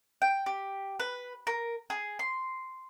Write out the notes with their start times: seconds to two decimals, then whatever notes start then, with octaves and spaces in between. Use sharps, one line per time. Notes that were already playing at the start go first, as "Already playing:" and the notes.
0.22 G5
0.46 G4
1.00 B4
1.47 A#4
1.90 G#4
2.19 C6